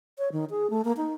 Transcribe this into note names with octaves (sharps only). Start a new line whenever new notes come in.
C#5
D#3
G#4
A3
A#3
D#4